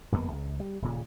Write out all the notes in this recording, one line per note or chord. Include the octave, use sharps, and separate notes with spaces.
G1 F2 A#3 B3
C#2
G3
D#1 A#2 C#3